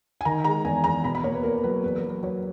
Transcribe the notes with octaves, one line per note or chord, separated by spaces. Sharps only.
G#5
D#3 A#5
G#3 A#5
E2 G#5
E2 A#5
B2 B5
B5
A#3 C#5
B4
A#3 A#4
F#3 B4
E2 B4
A#4
F#3
B4
F#3 C#5